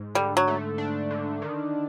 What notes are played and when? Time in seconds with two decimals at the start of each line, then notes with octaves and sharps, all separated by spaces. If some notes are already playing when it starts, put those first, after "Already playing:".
Already playing: G#2
0.15 D3 G3
0.37 F#3
0.48 A3
0.78 D4
1.11 D3
1.42 D#3